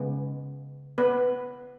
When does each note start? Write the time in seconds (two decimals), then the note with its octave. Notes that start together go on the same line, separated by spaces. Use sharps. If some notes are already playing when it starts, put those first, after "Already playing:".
Already playing: C#3 G#3 B3
0.98 B3 B4